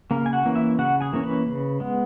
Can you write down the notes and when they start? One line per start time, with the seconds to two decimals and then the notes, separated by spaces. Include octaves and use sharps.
0.11 C#3 A#3 A#4
0.26 G#5
0.33 F#4 F#5
0.45 E3 A#3 C#4
0.55 E4 E5
0.79 C#3 F#4 F#5
1.01 G#4 G#5
1.13 E3 A#3 C#4
1.23 B4 B5
1.46 C#3
1.80 G#3 B3